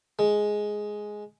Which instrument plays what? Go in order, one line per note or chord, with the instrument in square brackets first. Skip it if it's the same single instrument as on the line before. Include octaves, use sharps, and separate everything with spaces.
[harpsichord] G#3